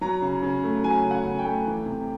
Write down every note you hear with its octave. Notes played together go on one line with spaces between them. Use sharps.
F#3 A#5
C#3
C#3
A3
F#3 G#5
C#3
F#5
C#3
G5
A3
E3
C3